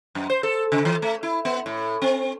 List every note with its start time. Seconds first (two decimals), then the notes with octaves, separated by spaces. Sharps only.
0.15 F#2
0.30 C5
0.43 A4
0.72 C#3
0.85 E3
1.02 A3
1.23 E4
1.45 B3
1.66 A2
2.02 C4